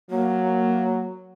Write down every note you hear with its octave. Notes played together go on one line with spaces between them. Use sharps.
F#3 A#3